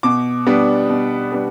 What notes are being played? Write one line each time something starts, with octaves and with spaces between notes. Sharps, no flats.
B2 D6
G3 B3 D4
B2
G3 B3 D4